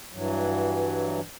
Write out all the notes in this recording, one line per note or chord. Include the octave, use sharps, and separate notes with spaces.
G2 E3 F#3